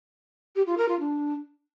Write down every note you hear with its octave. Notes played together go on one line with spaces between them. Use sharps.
G4
F4
A#4
F4
D4